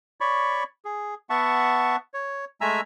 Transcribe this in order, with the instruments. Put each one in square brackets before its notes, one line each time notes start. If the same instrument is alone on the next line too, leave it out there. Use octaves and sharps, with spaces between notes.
[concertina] C#5 D5 B5 C#6
G#4
B3 E5 F#5 A5 C#6
C#5
G#3 A3 E5 G#5 A#5 E6